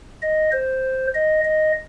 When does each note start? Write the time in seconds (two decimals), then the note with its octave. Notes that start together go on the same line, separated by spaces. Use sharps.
0.22 D#5
0.52 C5
1.14 D#5
1.44 D#5